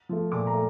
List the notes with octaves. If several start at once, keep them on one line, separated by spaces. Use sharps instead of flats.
F3 A3
A#2 D6
A#5
A3